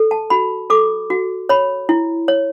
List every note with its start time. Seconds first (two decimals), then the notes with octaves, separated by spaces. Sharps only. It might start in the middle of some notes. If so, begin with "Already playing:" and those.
Already playing: A4
0.11 A5
0.30 F#4 B5
0.70 A4 D6
1.10 F#4
1.49 C#5 B5
1.89 E4
2.28 C#5